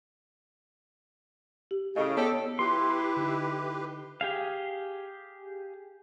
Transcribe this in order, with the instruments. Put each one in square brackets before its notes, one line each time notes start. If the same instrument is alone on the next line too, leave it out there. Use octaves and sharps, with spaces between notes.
[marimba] G4
[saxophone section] A2 C#3 [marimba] D#5
[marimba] B3 C#5 [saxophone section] D4 G4 A4
[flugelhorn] E4 [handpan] F4 [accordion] G4 B4 [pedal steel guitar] C6
[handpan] D3 D#4
[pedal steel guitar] G4 G#4 F5